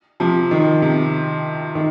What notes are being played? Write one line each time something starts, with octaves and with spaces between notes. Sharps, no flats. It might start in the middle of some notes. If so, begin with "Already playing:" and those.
C3 F3
D#3
C3
D#3